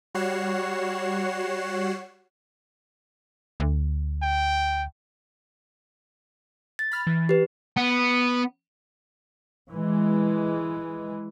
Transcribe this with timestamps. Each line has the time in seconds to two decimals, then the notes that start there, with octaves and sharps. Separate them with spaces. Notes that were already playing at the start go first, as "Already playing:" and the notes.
0.14 G3 F#4 C#5 F#5 C7 E7
3.60 D2
4.23 G5
6.79 A6
6.91 B5 F6
7.07 E3
7.29 G4 B4
7.77 B3
9.72 E3 G#3